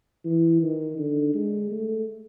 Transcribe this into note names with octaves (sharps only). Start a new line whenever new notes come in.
E3
D#3
D3
G#3
A3